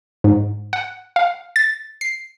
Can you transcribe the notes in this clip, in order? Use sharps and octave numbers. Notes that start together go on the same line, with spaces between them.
G#2
F#5
F5
A6
C7